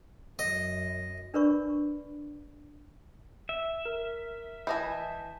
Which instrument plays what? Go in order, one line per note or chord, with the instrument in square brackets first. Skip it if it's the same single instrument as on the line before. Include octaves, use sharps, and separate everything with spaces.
[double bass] F#2 [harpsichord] D#5
[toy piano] D4 A#4 B4 D5 B5 C#6
[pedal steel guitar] E5
[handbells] A#4
[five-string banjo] E3 D#5 G#5 [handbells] A5 G6